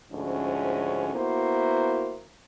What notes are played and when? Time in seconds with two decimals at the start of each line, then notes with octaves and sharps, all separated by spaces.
0.11 D2 G#2 F3 C#4
1.13 A#3 B3 E4 F#4 C5